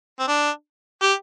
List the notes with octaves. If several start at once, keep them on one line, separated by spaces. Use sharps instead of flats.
C4
D4
G4